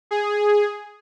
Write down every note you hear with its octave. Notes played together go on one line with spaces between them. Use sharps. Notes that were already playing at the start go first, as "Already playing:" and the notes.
G#4